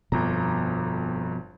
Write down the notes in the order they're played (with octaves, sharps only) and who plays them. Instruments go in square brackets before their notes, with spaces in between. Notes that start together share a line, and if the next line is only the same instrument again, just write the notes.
[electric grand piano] G1 F2 A#5 [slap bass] B2 F3